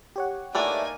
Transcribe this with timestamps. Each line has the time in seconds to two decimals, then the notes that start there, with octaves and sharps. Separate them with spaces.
0.16 G4 C#5 F#5
0.55 E3 A3 A#3 D4 D#4 D5 G#5